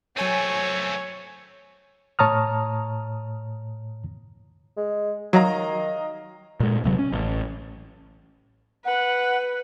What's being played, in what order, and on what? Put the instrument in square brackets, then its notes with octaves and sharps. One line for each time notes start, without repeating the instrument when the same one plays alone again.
[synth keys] F#3 G#5 D#7 [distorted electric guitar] A3 C4 [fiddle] C#5
[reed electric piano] A2 C#5 A5 A#5 D#6 F6
[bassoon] G#3
[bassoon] D#3 [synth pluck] F#3 [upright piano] D#5 F5 A#5
[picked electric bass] A#2 G#3
D#1 C3 F#3
C#4
A1
[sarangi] B4 [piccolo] F#5